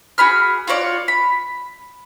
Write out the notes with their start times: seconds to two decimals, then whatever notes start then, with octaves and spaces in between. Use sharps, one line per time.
0.18 F#4 G#4 B5 F6
0.67 F4 F#4 C#5 D5
1.08 B5